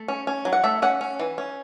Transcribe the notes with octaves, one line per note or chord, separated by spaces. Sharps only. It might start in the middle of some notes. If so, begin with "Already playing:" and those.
Already playing: A3
C#4
C#4
F#3
F#5
A3 E5
C#4 F#5
C#4
E3
C#4